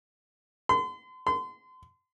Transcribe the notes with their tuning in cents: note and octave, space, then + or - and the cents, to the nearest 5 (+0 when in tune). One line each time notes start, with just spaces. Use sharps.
C6 -40
C6 -35